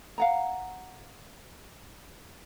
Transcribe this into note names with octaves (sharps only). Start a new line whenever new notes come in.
F5 F#5 A#5